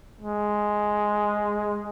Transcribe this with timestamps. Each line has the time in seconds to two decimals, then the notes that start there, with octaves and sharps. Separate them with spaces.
0.21 G#3